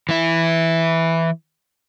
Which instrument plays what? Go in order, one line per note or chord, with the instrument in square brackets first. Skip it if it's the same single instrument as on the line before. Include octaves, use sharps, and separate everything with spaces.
[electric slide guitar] E3 E4